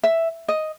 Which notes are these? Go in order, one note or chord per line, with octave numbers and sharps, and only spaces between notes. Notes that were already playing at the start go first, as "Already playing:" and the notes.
E5
D#5